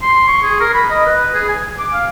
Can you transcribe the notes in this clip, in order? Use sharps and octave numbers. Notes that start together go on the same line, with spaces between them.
C6
C#6
G#4
A#4
B5
D#5
B4
G#4
G#5
D6
F5